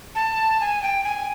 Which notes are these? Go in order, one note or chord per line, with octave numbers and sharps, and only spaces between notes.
A5
G#5
G5
G#5